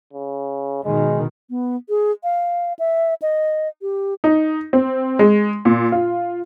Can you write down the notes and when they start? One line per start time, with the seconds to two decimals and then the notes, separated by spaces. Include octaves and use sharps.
0.13 C#3
0.85 B2 D#3 G#3
1.50 B3
1.89 G#4
2.24 F5
2.79 E5
3.22 D#5
3.82 G4
4.24 D#4
4.73 C4
5.19 G#3
5.65 A#2
5.92 F4